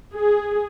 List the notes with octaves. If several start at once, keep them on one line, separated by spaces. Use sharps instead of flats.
G#4